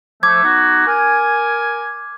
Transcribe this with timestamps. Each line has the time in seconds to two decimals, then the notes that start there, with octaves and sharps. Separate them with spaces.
0.23 F3 A3 D6 G#6
0.43 B3 D#4 F#4
0.87 A#4 G#5